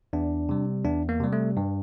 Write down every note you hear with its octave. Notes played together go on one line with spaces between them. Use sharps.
E2 D4
C3 G3
E2 D4
A#3
C3 G3
A3
G2